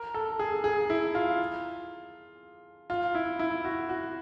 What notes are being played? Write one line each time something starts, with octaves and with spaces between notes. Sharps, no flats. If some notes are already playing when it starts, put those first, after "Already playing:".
Already playing: A#4
A4
G#4
G#4
E4
F4
F4
E4
E4
F#4
F#4